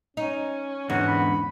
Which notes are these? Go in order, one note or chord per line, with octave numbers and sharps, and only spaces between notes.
C#4 D#4
E2 G#2 D3 B3 C#4 F#4
B5